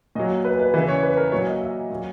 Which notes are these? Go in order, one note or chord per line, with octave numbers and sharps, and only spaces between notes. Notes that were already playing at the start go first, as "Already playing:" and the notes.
A#2 F#3 D#5
B4
B4
C#3 E3 B4
C#5
B4
A#4
A#2 F#3 C#5
D#5
E5
A#2 F#3